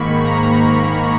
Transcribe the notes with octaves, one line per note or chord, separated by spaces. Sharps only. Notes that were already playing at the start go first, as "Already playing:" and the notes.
Already playing: G#2 D#3 A#3 B5 C#6
A#5